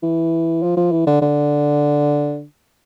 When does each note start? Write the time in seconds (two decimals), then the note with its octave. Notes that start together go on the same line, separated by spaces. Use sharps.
0.03 E3
0.63 F3
0.77 F3
0.91 E3
1.07 D3
1.22 D3